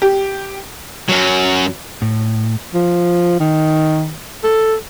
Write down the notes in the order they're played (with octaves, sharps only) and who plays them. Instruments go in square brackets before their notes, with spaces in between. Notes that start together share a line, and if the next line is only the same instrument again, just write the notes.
[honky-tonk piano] G4
[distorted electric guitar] F#2 F#3
[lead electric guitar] A2
[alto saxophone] F3
D#3
A4